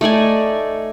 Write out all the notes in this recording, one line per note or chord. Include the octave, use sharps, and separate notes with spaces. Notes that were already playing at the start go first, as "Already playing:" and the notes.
A3 D#4 D5 G#5